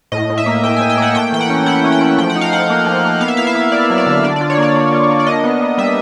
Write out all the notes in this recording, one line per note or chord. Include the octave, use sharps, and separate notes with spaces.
A2 D#5
A2
E5
A#3
A2 G5
A2 G#5
G5
A#3 F#5
A3 G5
E3 G5
F#5
C#4
E4 F#5
C#4
G5
A3
F3 G5
F#5
D#4
F5
F3 F#5
A#3
F3
A#3
B3 F5
E5
E4 F5
E5
B3
E4 D5
F#3
D5
D3
D4 D5
D5
F4
C#5
A#3 D5
A#3
F4
A#3
D5
D4 D#5
B3
B3
G3 E5